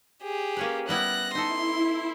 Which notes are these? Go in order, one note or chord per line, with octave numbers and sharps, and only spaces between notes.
G4 G#4
A#3 C#4 B4
G3 B3 E4 F#6 A#6
D#4 E4 A4 C6